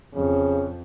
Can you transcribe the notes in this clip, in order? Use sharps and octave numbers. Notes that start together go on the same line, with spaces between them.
F2 C#3